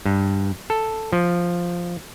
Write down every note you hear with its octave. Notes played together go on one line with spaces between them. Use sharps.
G2
A4
F3